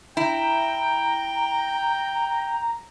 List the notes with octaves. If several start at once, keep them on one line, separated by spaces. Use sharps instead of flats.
E4 G5 A#5